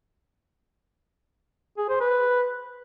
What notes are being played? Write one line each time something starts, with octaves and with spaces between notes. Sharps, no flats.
G#4
C5
B4